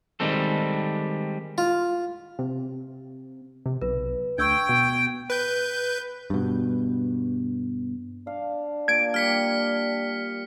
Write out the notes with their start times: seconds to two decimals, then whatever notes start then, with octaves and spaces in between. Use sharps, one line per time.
0.20 D#3 G3 G#3 C4 A4
1.58 F4
2.39 C3
3.66 C3
3.82 B1 B4
4.38 D2 G5 C#6 E6 G#6
4.69 B2
5.30 B4 G6
6.30 G2 B2
8.27 D4 F5
8.88 A#2 G#6 D7
9.14 G3 F6 B6 C#7